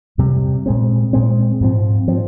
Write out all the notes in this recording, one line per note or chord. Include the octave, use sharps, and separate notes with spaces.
F2 C3 G3
A#2 G#3 C4
A#2 G#3 C4
G#2 F3 C4
F3 C4